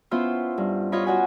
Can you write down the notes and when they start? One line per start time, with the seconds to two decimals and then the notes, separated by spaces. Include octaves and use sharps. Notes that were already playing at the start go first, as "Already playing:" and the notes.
0.11 B3 C#4 E4 F4 C5 E5
0.58 G2
0.92 F4 C#5 D#5 B5
1.06 F4 F#4 C#5 D#5 F#5 G#5